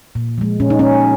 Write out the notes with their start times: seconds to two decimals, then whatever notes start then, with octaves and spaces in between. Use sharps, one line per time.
0.15 A#2
0.38 F3 G#3
0.60 A#2 C#4
0.70 D#4
0.79 G#3 C#4